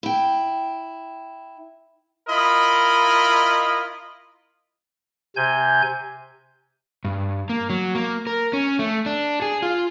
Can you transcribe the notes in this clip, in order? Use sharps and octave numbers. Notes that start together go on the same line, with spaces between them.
E4 G5
E4 F4 A#4 D#5 B5
C3 G#5 G6
G2
A#3
F#3
A#3
A#4
C#4
A3
D4
G#4
F4